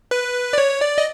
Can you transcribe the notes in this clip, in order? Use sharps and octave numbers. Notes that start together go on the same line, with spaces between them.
B4
D5
C#5
D5
D#5